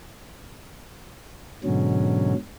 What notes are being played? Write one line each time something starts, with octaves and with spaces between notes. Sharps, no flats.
G#2 B2 D3 F#3 C#4